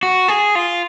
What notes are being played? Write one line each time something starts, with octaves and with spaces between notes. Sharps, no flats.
F#4
G#4
F4